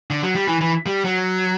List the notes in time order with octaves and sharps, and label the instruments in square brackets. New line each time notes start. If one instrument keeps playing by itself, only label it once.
[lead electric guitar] D3
F#3
G3
E3
E3
G3
F#3